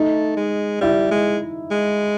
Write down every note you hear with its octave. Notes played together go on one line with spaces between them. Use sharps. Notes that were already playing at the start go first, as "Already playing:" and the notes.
Already playing: A3 D#4
G#3
G3 E4
G#3
G#3